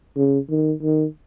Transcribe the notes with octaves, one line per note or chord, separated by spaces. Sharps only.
C#3
D#3
D#3